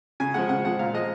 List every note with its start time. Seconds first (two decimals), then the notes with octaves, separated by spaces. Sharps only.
0.20 C#3 G#5
0.34 F3 G#3 F#5
0.49 C#3 F#5
0.65 F3 G#3 F#5
0.79 A#2 F5
0.94 F3 G#3 D#5